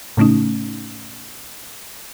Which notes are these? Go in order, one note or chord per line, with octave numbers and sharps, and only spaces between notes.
A2 C#3 A3 C#4 D#4